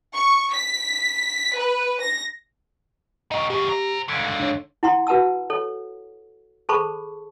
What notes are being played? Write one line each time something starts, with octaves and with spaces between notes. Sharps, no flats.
C#6
B6
B4
A#6
D#4 F#4 D#5
E2 C#3 G4
C5 A#5
C#2 D3 G#6 B6 C#7
D4 C#5
E4 F#5 A#5 C6
F#4 B4 F#5 A5 E6
A4 C#5
G#4 A4 C5 A5 B5 C#6